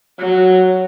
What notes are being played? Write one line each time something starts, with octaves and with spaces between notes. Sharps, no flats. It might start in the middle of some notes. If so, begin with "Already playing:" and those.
F#3